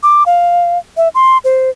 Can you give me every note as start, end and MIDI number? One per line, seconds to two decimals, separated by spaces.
0.03 0.23 86
0.26 0.78 77
0.97 1.08 76
1.15 1.38 84
1.44 1.70 72